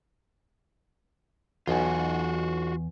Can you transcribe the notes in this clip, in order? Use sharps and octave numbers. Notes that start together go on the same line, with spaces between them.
B1 E2 B2 F4 F#4 G#5